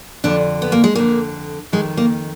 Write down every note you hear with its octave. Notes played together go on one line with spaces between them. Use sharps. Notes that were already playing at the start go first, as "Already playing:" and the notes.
F2 D3 D4
B3
A#3
G#3
F2 D3 A#3
F2 D#3 G#3
A#3